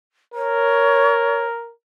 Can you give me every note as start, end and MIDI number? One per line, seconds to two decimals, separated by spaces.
0.34 1.72 70
0.34 1.44 73